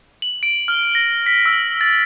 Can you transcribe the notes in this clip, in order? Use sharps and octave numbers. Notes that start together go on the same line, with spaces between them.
F#7
D7
F6
A#6
B6
E6
A6